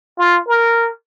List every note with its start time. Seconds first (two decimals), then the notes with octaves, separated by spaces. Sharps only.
0.18 F4
0.48 A#4